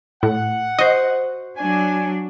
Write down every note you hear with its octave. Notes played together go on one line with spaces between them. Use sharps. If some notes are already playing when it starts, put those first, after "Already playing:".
A2 F#5
F#4 C5 D#5
F#3 D4 G#5